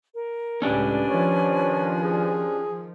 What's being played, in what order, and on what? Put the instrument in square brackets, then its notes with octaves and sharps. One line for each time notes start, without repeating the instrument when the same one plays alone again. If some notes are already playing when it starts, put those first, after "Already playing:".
[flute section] A#4
[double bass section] C#2 A2 [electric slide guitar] C#4 D4 G4 [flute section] B4 D5 G#5
[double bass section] D#3 F3 [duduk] C#5
[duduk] G#4